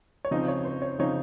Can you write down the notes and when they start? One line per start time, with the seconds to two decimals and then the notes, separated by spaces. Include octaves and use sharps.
0.25 C#5
0.31 C#3 F3 C4 D#4 D#5
0.48 C#5
0.65 C5
0.82 C#5
0.99 C#3 F3 C4 D#4 C#5